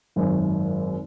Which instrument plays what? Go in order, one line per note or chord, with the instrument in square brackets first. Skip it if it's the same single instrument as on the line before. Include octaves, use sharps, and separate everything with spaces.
[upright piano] G#1 F#2